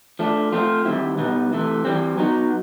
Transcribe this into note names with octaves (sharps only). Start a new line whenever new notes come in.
F3 A3 D4
F3 A3 C4 F4
D#3 G3 C4 E4
B2 G3 B3 D#4
C3 E3 A3
E3 G3 C4
F#3 B3 D#4